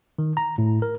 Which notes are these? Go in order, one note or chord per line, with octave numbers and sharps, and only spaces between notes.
D#3
A#5
A2
A#4